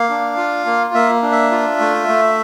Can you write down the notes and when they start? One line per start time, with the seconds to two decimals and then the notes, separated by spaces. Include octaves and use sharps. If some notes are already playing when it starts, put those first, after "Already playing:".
Already playing: A#3 F5
0.09 D4
0.37 F4
0.66 A#3
0.94 A#3 E5
1.23 D4
1.32 E5
1.51 F4
1.80 A3
2.08 A3